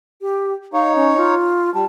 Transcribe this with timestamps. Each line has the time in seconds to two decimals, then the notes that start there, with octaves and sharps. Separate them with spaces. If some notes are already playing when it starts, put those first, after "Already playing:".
0.21 G4
0.73 D#4 C#5 F5
0.95 C#4
1.17 F4
1.74 G3 A5